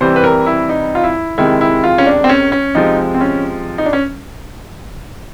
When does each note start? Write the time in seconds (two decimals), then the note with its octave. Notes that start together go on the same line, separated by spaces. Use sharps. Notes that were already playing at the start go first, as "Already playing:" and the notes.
0.01 C3 E3 G3 C5
0.16 B4
0.24 A#4
0.46 E4
0.69 D#4
0.95 F4
1.04 E4
1.38 C3 D#3 G#3 E4
1.61 E4
1.84 F4
1.98 C#4
2.07 D4
2.24 C4
2.29 C#4
2.52 C#4
2.75 C3 F3 G#3 D#4
3.14 C4
3.21 C#4
3.78 D#4
3.86 D4
3.93 C#4